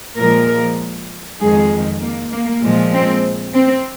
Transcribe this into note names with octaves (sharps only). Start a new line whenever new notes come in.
A#2 F3 G#3 A#4
F2 D#3 G#3 G#4
A#3
A#3
A#2 F3 G#3
C4
C4